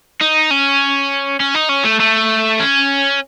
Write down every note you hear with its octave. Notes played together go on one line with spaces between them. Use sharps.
D#4
C#4
C#4
D#4
C#4
A3
A3
C#4